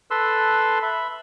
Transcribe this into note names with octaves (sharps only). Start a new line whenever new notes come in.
A4 B4 C6 E6
E5 B5